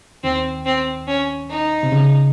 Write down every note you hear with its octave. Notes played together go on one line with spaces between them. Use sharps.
D#2 D#3 C4
C4
C#4
D#4
C3
C#3